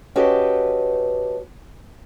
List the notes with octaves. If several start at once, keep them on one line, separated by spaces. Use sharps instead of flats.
C#4 F#4 G4 A4 B4 D#5